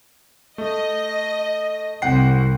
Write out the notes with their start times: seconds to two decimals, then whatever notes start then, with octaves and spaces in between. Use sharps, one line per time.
0.58 A3 D#5
2.02 C2 F#5 G5 C7